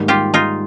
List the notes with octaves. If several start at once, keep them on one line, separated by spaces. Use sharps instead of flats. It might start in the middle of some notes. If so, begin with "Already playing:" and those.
Already playing: G#2 D#3 G3 A#3
F4 G4
D#4 F4